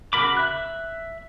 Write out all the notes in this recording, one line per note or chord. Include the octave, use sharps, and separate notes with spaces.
C#3 F#4 A#4 B5 D6
E5 F#6